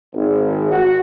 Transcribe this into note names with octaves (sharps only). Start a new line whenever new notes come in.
G#1
F#4 F#5